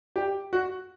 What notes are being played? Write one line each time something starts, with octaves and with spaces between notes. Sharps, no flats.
G4
F#4